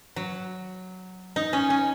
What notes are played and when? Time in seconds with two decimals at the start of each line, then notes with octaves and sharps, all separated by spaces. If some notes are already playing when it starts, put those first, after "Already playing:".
0.16 F#3
1.36 D#4
1.53 C#4
1.70 C#4